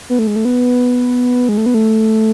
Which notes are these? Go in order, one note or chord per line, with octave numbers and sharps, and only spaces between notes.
B3
A3
G#3
A3
B3
G#3
A3
B3
A3